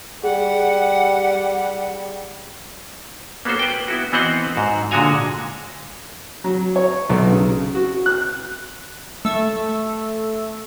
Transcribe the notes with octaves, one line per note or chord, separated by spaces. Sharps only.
G3 G#4 F#5
A#3 B3 C#4 F#4 A4 C5
B4 G5
B3 E4 F#4
E3 B3 C4 C5 D#5 F#5
G#2 F#4
A#2 D3 G#3 F#4 G#5 A#5
F#3
C#5
B1
C#3
F#4
F#6
A3 E5